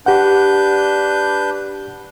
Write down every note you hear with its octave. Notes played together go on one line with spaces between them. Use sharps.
D4 G4 B4 F#5 G6